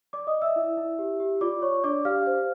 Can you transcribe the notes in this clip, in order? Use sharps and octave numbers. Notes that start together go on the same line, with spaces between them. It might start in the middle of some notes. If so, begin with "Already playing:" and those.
D5 D6
D#5 D#6
D5
E5 E6
E4
E4
G4
G4
F4 D5 D6
C#5 C#6
D4 D5 D6
G4 F5 F6
C5